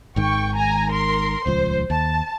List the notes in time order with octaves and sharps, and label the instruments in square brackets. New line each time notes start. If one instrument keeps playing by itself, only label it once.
[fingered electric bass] G#1 G#2 D#3 [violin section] G5 C#6
[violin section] G#5 A#5
A#4 C6
[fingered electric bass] D#1 C#2 F3 [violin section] C5
[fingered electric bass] D#2 [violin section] A5